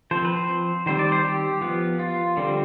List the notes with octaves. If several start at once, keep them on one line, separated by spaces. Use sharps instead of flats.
F3 C4 C5
B4
C5
D#3 G3 C4 C5
D5
C5
G4
F3 B3
F4
D3 G3 C4